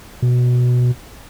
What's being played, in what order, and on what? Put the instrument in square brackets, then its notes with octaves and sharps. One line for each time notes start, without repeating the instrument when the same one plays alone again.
[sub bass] B2